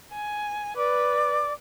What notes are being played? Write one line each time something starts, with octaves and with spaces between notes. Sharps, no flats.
G#5
B4 D5 D6